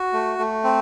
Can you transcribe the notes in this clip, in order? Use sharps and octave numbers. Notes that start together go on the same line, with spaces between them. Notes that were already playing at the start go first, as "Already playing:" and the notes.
Already playing: F#4
A3
A3
C4